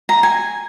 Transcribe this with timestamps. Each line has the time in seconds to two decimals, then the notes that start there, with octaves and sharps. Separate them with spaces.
0.09 A#5
0.23 G#5